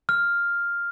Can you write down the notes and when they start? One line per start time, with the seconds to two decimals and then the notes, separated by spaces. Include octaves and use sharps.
0.09 F6